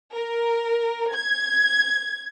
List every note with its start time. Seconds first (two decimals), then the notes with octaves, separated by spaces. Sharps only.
0.15 A#4
1.13 G#6